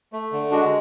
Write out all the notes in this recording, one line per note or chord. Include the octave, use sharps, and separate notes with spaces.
A3
D3
G#3 D4 F#4